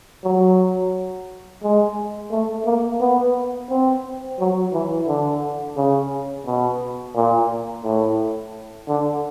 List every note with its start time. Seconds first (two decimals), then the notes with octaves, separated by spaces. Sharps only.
0.24 F#3
1.63 G#3
2.31 A3
2.66 A#3
3.01 B3
3.70 C4
4.39 F#3
4.73 E3
5.08 D3
5.77 C#3
6.46 B2
7.15 A#2
7.84 A2
8.88 D3